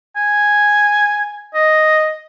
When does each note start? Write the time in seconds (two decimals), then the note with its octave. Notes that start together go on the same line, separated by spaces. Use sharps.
0.16 G#5
1.54 D#5